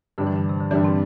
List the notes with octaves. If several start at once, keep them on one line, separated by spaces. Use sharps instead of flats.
G2 D3 G3 D4
E3
D3
C3
D3
G2 E3 G3 D4
C4